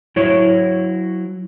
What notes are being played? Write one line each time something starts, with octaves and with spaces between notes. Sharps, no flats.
F#3 E4 C#5